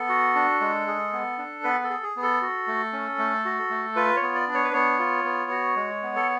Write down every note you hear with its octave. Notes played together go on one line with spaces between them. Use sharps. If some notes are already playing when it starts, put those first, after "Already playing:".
Already playing: B3 A4
F#4
D4
G#3
G#4
B3
D4
B3 B4
A4
G#4
G#4
B3
A4
F#4
A3
C#4
A3
F#4
A3
F4 B4
C#5
B3
D5
D4
C#5
B4
B3 C#5
F4
B3
F#4
G#3
B3
A4